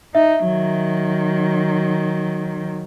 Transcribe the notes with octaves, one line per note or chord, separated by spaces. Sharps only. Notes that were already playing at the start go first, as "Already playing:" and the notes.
D#4 E5
D#3 F#3